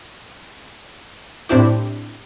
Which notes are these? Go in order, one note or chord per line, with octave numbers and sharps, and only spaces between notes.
A2 C4 D4 E4 G4